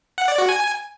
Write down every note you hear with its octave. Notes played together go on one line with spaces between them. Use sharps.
F#5
D5
F#4
G#5